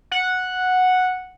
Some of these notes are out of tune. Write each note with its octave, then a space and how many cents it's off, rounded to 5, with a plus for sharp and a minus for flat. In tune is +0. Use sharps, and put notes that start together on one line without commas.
F#5 -5